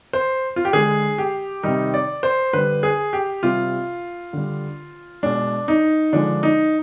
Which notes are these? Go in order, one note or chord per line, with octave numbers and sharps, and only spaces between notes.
C5
F4
G4
D3 G#3 G#4
G4
C3 D#3 G3 D#4
D5
C5
D3 G3 B4
G#4
G4
C3 G3 F4
D3 G3
B2 G#3 D4
D#4
D3 F3 G#3 D4
D#4